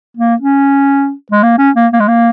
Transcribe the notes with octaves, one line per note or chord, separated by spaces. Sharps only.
A#3
C#4
G#3
A#3
C#4
A#3
A#3
G#3
A#3